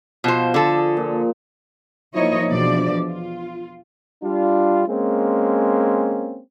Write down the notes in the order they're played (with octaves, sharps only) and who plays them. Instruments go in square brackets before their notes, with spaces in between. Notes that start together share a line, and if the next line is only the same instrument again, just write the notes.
[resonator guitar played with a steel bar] B2 C5 [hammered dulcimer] F3
[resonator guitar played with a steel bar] D3 A4
[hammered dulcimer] G#4
A#2
[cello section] F3 A#3 D#4 E4 C#5 D#5
E2 B2 F3 D4 D5
F4
[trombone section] G3 D4 F4
G#3 A#3 C4 C#4